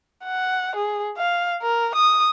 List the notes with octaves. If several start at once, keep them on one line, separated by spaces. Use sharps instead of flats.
F#5
G#4
F5
A#4
D#6